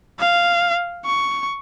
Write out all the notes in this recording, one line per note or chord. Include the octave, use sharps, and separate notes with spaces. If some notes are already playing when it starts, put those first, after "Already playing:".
F5
C#6